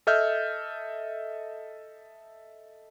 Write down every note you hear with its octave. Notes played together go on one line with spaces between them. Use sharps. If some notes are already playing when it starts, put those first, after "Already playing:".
A4 D#5 E5 F6 G6